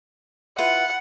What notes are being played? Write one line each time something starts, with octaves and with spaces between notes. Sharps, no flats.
E4 F4 B4 F#5